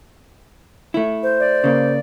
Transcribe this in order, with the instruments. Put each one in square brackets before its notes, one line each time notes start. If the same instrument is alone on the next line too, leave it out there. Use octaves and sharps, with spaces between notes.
[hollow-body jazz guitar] A3 E4
[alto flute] C5
[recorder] D5
[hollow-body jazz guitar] C#3 A#3